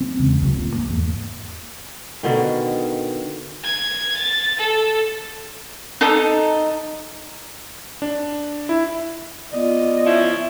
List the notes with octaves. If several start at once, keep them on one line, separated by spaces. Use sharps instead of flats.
C4
E2 C#3 G#3
F#1 C#2 F#2 C3
D2 A#2
D2 A#3
E2 G#2
B2 D3 D#3
G#6
A6
A4
D#4 A4 A#5
D4
E4
B3 F4 D5 D#5
F3 C#4 E4